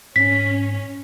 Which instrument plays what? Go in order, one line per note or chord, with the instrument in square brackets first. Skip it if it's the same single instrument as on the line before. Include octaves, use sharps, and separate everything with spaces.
[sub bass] G#2 [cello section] C#4 [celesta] B6